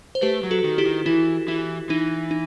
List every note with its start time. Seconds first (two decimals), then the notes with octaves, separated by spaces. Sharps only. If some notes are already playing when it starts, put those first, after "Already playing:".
0.15 C5
0.22 A3 G4 B4
0.43 F#3
0.51 F#4 A4
0.64 D#3
0.78 E4 G4
0.85 D#3
1.06 E3 E4
1.48 E3 E4
1.89 E3 D#4
2.31 D#4